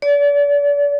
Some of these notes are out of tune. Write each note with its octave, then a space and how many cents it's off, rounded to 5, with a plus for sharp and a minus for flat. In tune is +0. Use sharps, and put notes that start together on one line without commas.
D5 -40